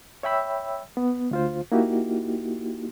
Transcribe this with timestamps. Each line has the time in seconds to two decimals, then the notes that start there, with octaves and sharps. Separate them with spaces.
0.23 C#5 E5 G5 B5 E6
0.97 B3
1.31 D2 F4 C5
1.72 A#3 D#4 E4 F#4 G4